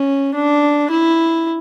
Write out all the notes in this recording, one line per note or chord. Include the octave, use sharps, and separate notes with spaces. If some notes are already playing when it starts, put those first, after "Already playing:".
Already playing: C#4
D4
E4